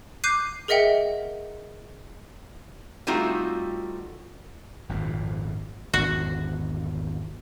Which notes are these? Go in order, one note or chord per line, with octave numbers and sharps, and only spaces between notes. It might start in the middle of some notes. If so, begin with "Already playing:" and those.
D6 F#6 G6 C7 D#7
G#4 A#4 D#5 E5 F#5 G5
G3 A3 C4 D#4 F4 F#4
G#1 F2 A#2
G#1 E2 D3 F#4